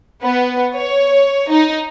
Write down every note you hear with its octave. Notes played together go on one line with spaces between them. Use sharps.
B3
C#5
D#4